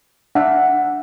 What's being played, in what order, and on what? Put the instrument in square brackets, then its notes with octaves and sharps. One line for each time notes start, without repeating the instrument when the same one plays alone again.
[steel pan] D4 E5 [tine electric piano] F#5